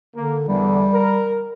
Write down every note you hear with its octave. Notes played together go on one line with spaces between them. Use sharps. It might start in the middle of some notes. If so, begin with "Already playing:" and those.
D3 A#3
E2 D3 G3
A#4